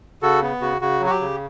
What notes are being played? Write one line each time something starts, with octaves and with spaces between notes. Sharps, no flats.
C#3 F#4 A4
B3
C#3 F#4
C#3 F#4
F#3
F#4
G4
C#3